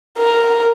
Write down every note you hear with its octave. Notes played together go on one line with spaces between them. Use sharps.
A#4